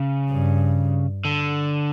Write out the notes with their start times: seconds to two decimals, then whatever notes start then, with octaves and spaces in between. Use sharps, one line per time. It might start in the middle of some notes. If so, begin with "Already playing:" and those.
Already playing: C#3
0.30 G2
1.25 D3